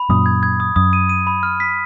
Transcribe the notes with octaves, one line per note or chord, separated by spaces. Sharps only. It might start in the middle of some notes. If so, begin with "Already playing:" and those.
Already playing: B5
F#2 A#2 D#6
G#6
G#6
D#6
F#2 D#6
D#7
D#7
B5
F6
B6